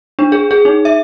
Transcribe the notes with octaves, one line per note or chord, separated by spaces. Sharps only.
D4
G#4
G#4
D#4
E5